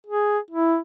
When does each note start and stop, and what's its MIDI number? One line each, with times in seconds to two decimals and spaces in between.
0.07 0.39 68
0.51 0.78 64